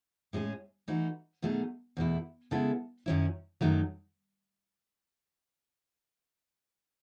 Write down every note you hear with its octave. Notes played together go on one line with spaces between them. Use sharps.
A2 G#3 C#4 G#4
E3 A3 D#4 F#4
B2 F#3 A3 D#4 G#4
E2 B2 A3 E4
C#3 G#3 B3 E4 A4
F#2 D#3 F#3 C#4 E4
F#2 D#3 F#3 A3 D#4